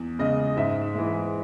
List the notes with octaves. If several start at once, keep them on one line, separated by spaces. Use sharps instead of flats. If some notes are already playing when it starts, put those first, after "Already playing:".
Already playing: E2
C#3 G#3 D#5
G#2 E5
E3 G#3